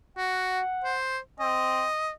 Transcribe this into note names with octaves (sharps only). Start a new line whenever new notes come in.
F#4 F#5
C5
C4 D#5